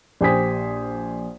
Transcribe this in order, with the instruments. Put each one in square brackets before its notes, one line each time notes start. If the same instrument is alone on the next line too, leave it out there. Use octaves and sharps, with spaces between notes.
[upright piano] A#1 G4 C5 G#5 D#6 B6